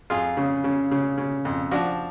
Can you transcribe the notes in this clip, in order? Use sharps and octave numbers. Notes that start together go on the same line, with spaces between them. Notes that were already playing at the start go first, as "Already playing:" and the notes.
F2 F4 G#4
C#3
C#3
C#3
C#3
F2
F3 D4 F#4